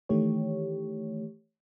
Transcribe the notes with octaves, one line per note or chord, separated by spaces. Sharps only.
D#3 E3 A3 G4 C#5